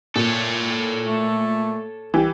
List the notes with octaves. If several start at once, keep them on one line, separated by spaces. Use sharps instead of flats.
A#2 A4 C#5
A3
C2 E3 G4